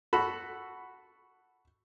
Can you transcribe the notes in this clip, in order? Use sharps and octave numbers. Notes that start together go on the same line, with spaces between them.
F#4 A4 B5